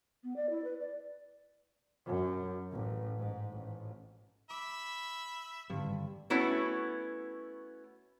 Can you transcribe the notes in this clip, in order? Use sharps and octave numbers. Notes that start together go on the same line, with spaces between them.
B3
D5
E4
B4
D5
F#2
A1
G#2
A1
E5 B5 D6
G#1 G2 D3 G3
A3 B3 C#4 E4 F#4